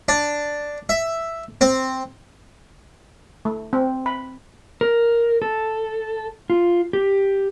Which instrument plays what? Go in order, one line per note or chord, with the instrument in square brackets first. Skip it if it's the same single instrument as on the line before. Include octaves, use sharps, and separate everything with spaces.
[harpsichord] D4
E5
C4
[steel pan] A3
C4
B5
[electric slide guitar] A#4
A4
F4
G4